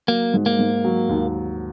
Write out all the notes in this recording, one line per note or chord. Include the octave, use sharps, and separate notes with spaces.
F#3 A#3
G#2
A#3
G#2
F#3
D#2